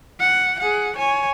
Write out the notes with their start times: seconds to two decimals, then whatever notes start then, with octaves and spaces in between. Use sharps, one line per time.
0.20 F#5
0.59 G#4 F#5
0.96 C#5 G#5